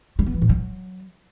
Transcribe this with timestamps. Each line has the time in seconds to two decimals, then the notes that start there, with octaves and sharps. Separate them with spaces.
0.19 A3
0.26 B3
0.34 E3
0.42 A2
0.49 F#3